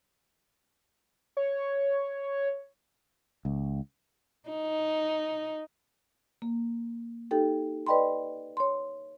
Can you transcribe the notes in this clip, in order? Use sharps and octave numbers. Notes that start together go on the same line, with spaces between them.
C#5
C#2
D#4
A#3
D#4 G4 A4 G5
B4 D5 D#5 G5 B5 C6
C#5 C6